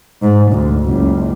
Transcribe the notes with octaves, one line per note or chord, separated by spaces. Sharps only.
G#2
D2
F#1 C#2